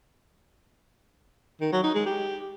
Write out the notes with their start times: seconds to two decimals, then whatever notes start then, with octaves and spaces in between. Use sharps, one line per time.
1.61 D#3
1.72 F#3
1.84 D#4
1.95 G#3
2.06 G4